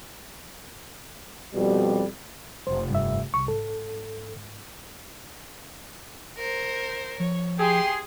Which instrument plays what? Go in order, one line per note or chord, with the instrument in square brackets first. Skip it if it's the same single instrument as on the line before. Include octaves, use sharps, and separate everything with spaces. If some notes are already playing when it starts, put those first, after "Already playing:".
[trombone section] F2 B2 G3
[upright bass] F1 [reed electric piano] C5
[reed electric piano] G2 E5
[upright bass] C2 [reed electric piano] C#6
[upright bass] G#2 [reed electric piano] A4
[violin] A#4 C5
[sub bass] F3 [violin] C#5
[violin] G4 C6 [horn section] G#4 [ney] G5